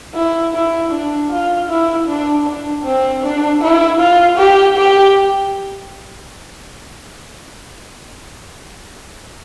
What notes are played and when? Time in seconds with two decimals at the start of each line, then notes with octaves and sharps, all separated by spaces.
0.14 E4
0.54 E4
0.91 D4
1.30 F4
1.69 E4
2.08 D4
2.46 D4
2.84 C4
3.23 D4
3.62 E4
3.99 F4
4.38 G4
4.77 G4